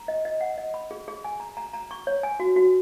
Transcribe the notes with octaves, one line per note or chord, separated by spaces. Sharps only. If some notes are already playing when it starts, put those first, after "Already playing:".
Already playing: A#5
D#5
D#5
F#5
D#5
B5
G#4
G#4
G#5
A#5
A#5
A#5
C#6
C#5
G#5
F#4
F#4